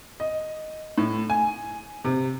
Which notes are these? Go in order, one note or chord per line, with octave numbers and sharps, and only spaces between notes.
D#5
A2
G#5
C3